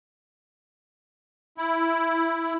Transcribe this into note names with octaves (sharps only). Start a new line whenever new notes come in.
E4